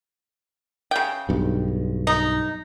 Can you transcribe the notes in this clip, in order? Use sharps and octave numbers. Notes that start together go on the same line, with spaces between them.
C#3 G5
B1 G2
D#4